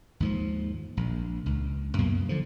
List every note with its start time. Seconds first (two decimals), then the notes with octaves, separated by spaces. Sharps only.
0.20 D#2 G#2 F3
0.97 A#1
1.46 C#2
1.98 F#2 B2 A#3
2.29 D3 F3